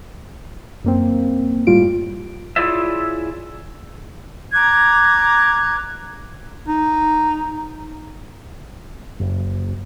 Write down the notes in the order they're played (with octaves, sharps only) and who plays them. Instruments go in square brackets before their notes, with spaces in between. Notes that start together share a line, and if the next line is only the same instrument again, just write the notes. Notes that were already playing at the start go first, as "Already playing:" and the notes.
[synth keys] F#2 A#3 C4
G1 A2 G3 F4 D7
[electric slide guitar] E4 F4 G#4 C#5 D5 E5
[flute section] A#5 D6 F#6 G#6
[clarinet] D#4
[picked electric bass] F#1